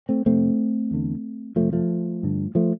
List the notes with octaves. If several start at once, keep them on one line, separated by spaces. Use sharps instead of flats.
A3 C4
F2 C3 A3 C4
E2 D3
F2 C3 F3 A3
F3 A3
G2 D3
F3 A3